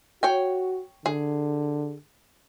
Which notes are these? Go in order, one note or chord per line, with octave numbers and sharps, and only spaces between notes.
F#4 C#5 G5 G#5
D3 G#4